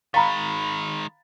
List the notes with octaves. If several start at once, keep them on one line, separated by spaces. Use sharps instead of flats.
D#3 G#3 F5 G5 A#5 B5 A6